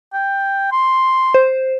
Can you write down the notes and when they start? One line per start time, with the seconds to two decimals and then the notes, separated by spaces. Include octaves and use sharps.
0.13 G5
0.72 C6
1.34 C5